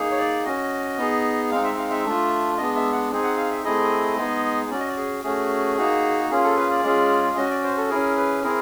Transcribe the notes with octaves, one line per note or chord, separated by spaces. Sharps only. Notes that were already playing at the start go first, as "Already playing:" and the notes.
Already playing: A#3 D#4 G#4
C#5
D5
C#4 F#4 D#5
B3 D#4 G#4
G#3 C4 D#4 F5
E5
F5
E5
A3 D4 F4
G#3 B3 D4 D#5
E5
F#5
C4 D#4 G#4
F#5
F5
E5
A3 C4 E4 G#4 D#5
G#3 B3 D#4 G#4
C#4 F#4 D5
D#5
D5
G#4
A3 C#4 F#4 G#4
A#3 D#4 F#4
A#3 C#4 F4 G#4
A4
B4
D5
G#3 C#4 F4 G#4
C#4 F#4 D#5
D5
C5
A4
C#4 E4 G#4 A#4
B4
C4 E4 G#4 A#4